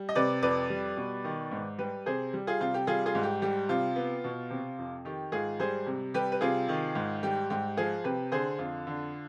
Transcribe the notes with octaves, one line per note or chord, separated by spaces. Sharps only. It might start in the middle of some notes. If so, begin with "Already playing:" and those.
Already playing: G3
D#5
C3 B4 D5
F2 B4 D5
G3
B2
D#3
G#2
G3 G4 B4
C3 G#4 C5
G3
F4 G#4
C3 F4
G4
G3 F4 G#4
F4 G#4
G#2
G4
G3 G4
C3 F4
B3
B2
C3
F2
D#3 G4
G#2 F4 G#4
G3 G#4 C5
C3
G3 G4 B4
B4
C3 F4 G#4
D#3
G#2
G3 G4
G#2 G4
F3 F4 G#4
C3 G4 B4
D3 G#4 C5
F2 F4
D3